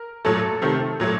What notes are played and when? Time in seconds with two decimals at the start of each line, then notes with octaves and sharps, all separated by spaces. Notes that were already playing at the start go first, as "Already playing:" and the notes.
Already playing: A#4
0.25 A#2 F#3 A3 A4
0.62 C3 D#3 A3
1.00 A#2 F#3 A3